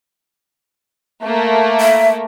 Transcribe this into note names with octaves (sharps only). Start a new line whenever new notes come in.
A3 A#3
E5